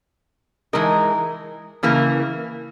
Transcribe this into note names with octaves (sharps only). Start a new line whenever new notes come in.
E3 G#3 D#4 A#4
C#3 E3 A#3